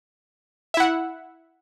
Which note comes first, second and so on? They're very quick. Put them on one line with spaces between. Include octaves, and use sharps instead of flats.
E5 E4 F#5